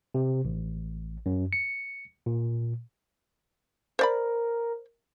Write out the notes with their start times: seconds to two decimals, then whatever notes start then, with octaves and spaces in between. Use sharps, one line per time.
0.15 C3
0.45 A1
1.26 F#2
1.53 C#7
2.26 A#2
3.99 A#4 C5 D5 B5